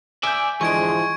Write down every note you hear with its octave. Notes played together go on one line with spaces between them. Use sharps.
D5 E5 G#5 G6
G#2 D3 E3 F3 G#3 C#6 G#6 D7